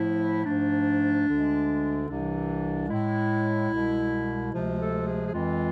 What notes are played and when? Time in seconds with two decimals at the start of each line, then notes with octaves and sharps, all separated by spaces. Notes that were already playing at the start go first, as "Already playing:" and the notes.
Already playing: A2 F3 A3 E4
0.45 G#2 F3 A3 D4
1.26 D2 D3 G#3
2.08 C2 C3 E3 D4
2.88 A2 G#3 E4
3.70 C2 B2 G#3
4.52 D2 C3 F3 G#3 F4
4.79 A4
5.05 G#4
5.26 G#4
5.33 F2 E3 G#3 F4